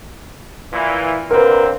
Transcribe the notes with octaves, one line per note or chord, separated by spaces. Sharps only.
A#2 E3
D3 A#3 C4 A#4 B4